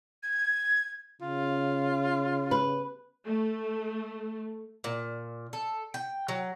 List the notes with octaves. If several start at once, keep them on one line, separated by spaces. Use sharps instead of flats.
G#6
C#3 F4
B4
A3
A#2
A4
G5
F#3